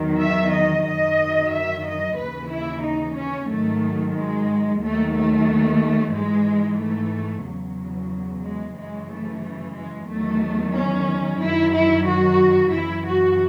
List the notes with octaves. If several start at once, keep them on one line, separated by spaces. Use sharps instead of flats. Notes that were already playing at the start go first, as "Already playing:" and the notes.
Already playing: E2 D#3 F#3
E5
D#5
F#2 D#3 F#3 D#5
E5
D#5
D#2 C#3 E3 B4
E4
D#4
C#4
G#2 D#3 F#3 A3
G#3
D#2 D#3 F#3 A3
A3
G#2 E3 G#3
A3
E2 C#3 F#3
G#3
F#2 C#3 E3 G#3
A3
A3
G#3
E2 D#3 F#3 A3
C#4
F#2 D#3 F#3 E4
E4
F#4
F#2 C#3 E3 E4
F#4